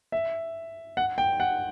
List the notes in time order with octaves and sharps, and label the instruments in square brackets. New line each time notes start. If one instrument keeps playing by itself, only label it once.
[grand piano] E5
F#5
G5
F#5